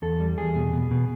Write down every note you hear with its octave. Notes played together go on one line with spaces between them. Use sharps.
E2 A4
G3
E2 G#4
B2
B2
B2